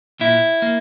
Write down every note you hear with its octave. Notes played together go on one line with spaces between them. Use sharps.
A#2 E4
A#3